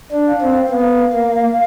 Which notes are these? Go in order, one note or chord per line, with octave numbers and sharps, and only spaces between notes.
D4
F5
C4
B3 F5
A#3